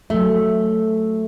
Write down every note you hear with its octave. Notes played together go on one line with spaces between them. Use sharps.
F#3 A3 E5